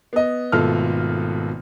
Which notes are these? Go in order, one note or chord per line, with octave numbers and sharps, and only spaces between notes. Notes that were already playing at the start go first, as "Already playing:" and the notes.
B3 D#5
G#1 B2 A3 F4 A4 F6